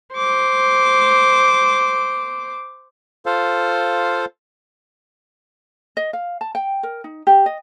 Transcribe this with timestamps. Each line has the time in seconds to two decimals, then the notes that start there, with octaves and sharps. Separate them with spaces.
0.15 C5 D6
3.26 F4 A4 C5 F5
5.97 D#5
6.13 F5
6.41 A5
6.55 G5
6.83 A#4
7.04 D#4
7.27 G4
7.46 D#5